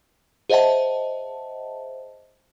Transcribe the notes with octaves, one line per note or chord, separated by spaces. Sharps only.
G#4 C5 D#5 E5 F#5 A5